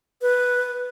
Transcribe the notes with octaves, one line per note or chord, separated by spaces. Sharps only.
B4